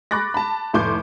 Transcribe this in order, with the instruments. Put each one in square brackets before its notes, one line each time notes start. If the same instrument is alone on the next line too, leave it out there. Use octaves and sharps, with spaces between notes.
[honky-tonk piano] B5 C#6 D6 F#6 A6 A#6
A5 B5
F1 A2 C6 D6 G6